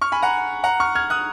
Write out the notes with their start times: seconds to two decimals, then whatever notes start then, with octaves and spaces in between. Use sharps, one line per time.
0.01 C#6 F6
0.12 G#5 B5
0.22 F#5 A#5
0.64 F#5 A#5
0.80 C#6 F6
0.95 F6 G#6
1.10 D#6 F#6